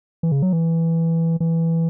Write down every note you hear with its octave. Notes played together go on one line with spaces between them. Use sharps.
E3
C#3
F#3
E3
E3